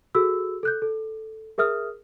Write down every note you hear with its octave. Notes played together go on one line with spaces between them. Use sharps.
F#4 G#4 A4 E6
A4 F#6 G6
A4
G#4 A#4 E5 D#6 F6